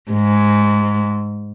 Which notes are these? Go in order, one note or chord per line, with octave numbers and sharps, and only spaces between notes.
G#2